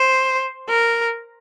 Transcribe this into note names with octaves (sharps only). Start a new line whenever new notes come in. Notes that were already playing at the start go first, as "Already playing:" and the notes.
Already playing: C5
A#4